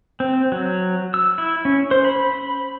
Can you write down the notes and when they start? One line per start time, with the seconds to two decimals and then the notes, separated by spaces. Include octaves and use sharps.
0.20 C4
0.52 F#3
1.14 E6
1.38 E4
1.65 C#4
1.91 C5
2.05 B5